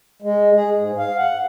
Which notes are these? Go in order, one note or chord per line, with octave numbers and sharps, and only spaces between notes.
G#3
G#4
G#2
F5
F#5